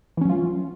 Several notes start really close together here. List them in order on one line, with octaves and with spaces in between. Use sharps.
E3 C#4 F#3 F4